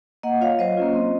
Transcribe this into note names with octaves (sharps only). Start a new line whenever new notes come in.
A#3 D#5 F#5
F4 C#5 F5
F#3 C5 D#5
A#3 C#4 F4
C4